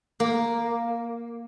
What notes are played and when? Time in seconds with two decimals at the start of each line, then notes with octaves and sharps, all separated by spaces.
0.20 A#3